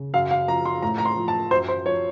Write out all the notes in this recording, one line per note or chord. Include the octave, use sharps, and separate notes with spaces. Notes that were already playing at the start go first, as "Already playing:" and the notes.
Already playing: C#3
F#2 F5
F5
F3 A#5
C6
A2 A#5
A#5
C6
F3
A5
F#2 C5
C5
F3 C#5